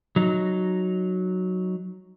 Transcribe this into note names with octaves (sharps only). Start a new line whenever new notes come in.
F#3 D#4